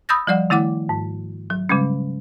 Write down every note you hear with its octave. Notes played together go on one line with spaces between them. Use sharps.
B5 D#6 E6 G6 A6 A#6
F3 G3 D5 F#5
D#3 A3 E4 F#5 D6
G#2
F#3
C#3 G3 G#3 C#4